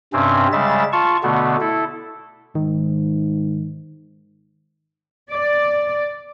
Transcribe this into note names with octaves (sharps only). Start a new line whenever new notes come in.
G2 C3 C4 C#4
C#3 G3 G#3 E5 A6
F4 A5 C#6
B2 D3 A3 B3
E4 A4
G#2 D#3
D5